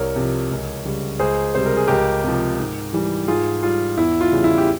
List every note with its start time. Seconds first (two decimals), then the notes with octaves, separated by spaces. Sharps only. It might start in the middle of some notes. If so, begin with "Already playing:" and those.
Already playing: C2 A#4 C#5
0.16 C3 F3
0.51 C#2
0.85 C#3 G3
1.19 C#2 G#4 C5
1.55 C3 G3 C5
1.66 A#4
1.77 G#4
1.87 C#2 G4 A#4
2.24 C3 F3
2.59 G#2
2.93 E3 G3
3.28 G#2 F4 G#4
3.63 G3 F4
3.97 E2 E4
4.21 F4
4.32 C#3 G3
4.44 E4
4.58 G4